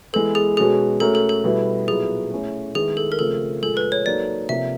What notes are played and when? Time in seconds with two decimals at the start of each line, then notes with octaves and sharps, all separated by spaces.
0.13 E3 G#3 B3 A4
0.35 G#4
0.57 B2 G#3 C#4 F#4 G#4 A4
1.00 A3 C#4 F#4 A4 A#4
1.15 A4
1.29 A4
1.44 B2 G3 B3 E4
1.88 A#2 F#3 B3 E4 G#4
2.31 A3 C#4 E4
2.75 D#3 G#3 B3 E4 G#4
2.97 A4
3.12 A#4
3.18 C#3 F3 A3 C4 F4 A4
3.63 A#2 F3 G#3 A4
3.77 B4
3.92 C#5
4.06 F#3 A#3 D#4 F#4 A4 D5
4.49 C3 F3 A#3 E5